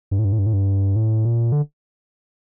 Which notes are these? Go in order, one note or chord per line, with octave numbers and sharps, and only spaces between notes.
G2
A2
G2
A2
G2
A2
G2
A2
A#2
D3